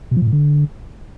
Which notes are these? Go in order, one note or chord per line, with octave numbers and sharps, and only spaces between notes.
B2
F3
A#2
A2
D3